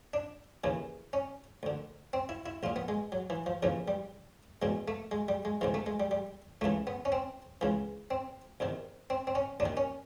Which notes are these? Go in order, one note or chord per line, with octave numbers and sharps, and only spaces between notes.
D4
D#2 C#3 E3
C#4
D2 D3
C4
E4
E4
A#1 A#2 F4
B3
G#3
F#3
E3
F3
D#2 C#3 E3 F3
G3
E2 B2 G#3
A3
G#3
G3
G#3
D2 C3 E3 G#3
A3
G#3
G3
G3
C#2 C#3 E3 A3
B3
C#4
C4
C#2 C#3 E3
C4
E2 C3 D#3
C4
C4
C#4
D#2 D4
D#3
C#4